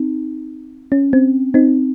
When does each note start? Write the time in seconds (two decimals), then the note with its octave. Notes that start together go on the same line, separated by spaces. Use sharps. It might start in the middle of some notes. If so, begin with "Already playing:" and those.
Already playing: C4 D#4
0.92 C#4
1.13 C4
1.54 C4 D#4